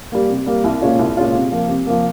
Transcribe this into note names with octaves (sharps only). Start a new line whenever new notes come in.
G3 A#3
C3
G3 A#3
C2
A#2 G#3 C#4 F4
C2
A#2 G#3 C#4 F4
C3
F3 A#3
C3
F3 A#3